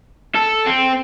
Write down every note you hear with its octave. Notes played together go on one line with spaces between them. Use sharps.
A4
C4